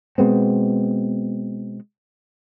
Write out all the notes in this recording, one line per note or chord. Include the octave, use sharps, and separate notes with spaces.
B2 G#3 B3 C4